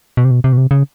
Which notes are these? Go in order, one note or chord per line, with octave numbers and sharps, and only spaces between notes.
B2
C3
B2
C3
B2
C3
C#3